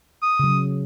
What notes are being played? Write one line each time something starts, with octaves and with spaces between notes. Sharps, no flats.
D#6
C#3 F#3